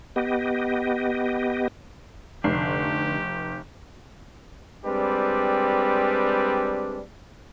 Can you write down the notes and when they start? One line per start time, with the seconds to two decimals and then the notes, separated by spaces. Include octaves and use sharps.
0.16 B3 G4 D#5
2.44 F1 D3 D4 G4 C7
4.85 G3 G#3 C4 D4 G4 B4